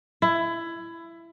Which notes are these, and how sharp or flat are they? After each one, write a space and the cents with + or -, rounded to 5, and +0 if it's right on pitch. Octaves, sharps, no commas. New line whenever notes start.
E4 +20